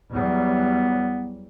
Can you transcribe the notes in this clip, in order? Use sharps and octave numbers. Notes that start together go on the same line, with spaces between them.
E2 F#3 G3 B3